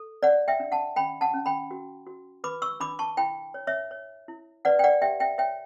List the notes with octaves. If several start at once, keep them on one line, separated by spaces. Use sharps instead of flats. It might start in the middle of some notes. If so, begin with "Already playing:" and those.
Already playing: A4
C#5 D5 F#5
E5 G5
D4
F#5 A5
C#4 G5 B5
F#5 A5
C#4
G5 B5
F#4
F#4
B4 B5 D6
C#6 E6
D4 B5 D6
A5 C#6
E4 G5 B5
C#5
C#5 E5
C#5
E4
B4 D5 F#5
G5
D5 F#5
G4 E5 G5
E5 G5
C#5 E5 G5